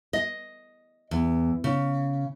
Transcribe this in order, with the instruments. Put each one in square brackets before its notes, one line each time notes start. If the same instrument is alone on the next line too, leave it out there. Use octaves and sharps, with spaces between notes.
[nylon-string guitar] D#5
E2
C#3